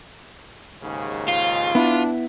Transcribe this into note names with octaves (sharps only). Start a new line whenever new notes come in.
D#2 G#2 C#3
F4
B3 D4 E4